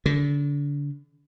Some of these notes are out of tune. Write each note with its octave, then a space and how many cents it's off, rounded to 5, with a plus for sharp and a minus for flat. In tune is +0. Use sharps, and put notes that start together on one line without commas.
D3 -35